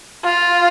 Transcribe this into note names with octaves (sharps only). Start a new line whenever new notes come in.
F4